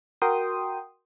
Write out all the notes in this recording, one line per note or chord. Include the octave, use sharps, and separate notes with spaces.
F#4 A#4 G5 C6 D#6